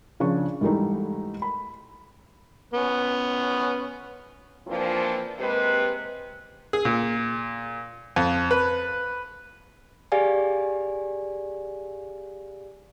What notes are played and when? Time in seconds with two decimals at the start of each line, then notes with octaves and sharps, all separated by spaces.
0.20 C#3 F3 D4 C#6
0.61 G#2 E3 G3 A3 D#4
1.42 B5
2.73 B3 C#4
4.67 E3 F3 A#3 C4 D4 F4
5.39 C3 G#3 A#3 G4 B4
6.73 G#4
6.85 A#2
8.16 F2
8.51 B4
10.12 G4 G#4 D5 F5 G#5